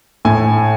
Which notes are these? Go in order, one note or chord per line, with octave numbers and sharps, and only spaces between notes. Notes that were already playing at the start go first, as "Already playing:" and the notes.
A2 G#5